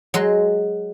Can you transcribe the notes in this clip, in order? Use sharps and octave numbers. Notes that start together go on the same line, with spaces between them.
F#3 G#3 C6